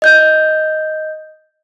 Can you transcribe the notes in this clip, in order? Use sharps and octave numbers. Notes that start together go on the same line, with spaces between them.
D#5 G6